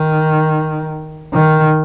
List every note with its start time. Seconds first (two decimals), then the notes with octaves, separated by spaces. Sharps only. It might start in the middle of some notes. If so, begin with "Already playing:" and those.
Already playing: D#3
1.33 D#3